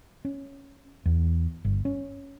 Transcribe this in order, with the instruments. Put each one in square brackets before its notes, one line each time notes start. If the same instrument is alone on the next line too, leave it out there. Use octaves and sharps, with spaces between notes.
[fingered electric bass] C#4
E2
G1
C#4